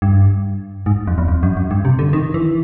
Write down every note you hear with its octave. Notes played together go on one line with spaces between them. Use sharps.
G2
G#2
F2
E2
F2
F#2
F#2
G2
C3
D3
D#3
E3